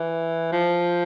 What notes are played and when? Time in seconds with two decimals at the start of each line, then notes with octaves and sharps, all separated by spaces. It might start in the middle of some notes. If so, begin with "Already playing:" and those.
Already playing: E3
0.52 F3